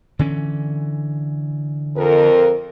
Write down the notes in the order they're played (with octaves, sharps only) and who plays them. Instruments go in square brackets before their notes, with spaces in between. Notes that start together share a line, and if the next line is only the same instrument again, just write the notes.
[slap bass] D3 E3 C#4
[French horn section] F2 A#4